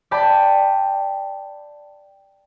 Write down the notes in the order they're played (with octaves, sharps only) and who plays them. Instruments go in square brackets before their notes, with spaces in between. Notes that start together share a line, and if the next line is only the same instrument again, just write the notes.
[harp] D5 G5 A5 B5